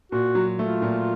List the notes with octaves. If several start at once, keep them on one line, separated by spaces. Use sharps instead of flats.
A#2 F#4
F#3
A3 F4
A#2